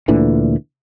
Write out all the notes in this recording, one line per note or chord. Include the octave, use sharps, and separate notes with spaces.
D2 A#2 D3 E3